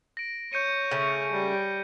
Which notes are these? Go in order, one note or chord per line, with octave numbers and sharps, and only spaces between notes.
A#6 D7
C#5 G6 C#7 D#7
C#3 A3 C#4
G3